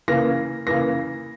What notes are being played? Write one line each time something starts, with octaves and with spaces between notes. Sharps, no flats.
C#3 E3 A#3 A#6
C#3 E3 A#3 A#6